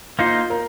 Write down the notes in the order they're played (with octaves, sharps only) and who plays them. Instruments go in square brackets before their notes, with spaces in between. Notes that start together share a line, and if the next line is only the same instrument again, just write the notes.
[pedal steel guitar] A#3 D#4 C5 [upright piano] F4
[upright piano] A#4